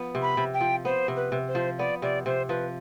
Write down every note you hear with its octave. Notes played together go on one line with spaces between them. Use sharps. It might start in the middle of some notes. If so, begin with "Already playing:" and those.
Already playing: F3 B3
C3
B5
C3
G5
F3
B3 C5
C3
B4
C3
C5
F3
B3 D5
C3 D5
C3 C5
F3 B4